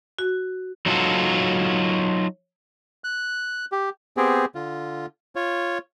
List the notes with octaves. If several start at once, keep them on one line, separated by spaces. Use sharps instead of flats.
F#4
F#3 D#4 F4 F#4 A4
F#6
G4
B3 C4 G4 G#4
D3 F4
F4 C#5